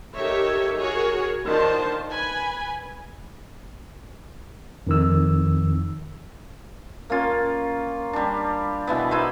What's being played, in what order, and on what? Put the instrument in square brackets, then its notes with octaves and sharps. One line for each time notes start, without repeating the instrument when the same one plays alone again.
[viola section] D#4 G4 A4 A#4 C#5 E5
F#4 G#4 A#4 C#5
D#3 D4 F4 C5 A5
B4 G#5 B5
[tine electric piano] F2 D#3 E6
[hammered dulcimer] A#3 C#4 F4
G3 D4
B2 E3 B3
D#4 E4 B4 C5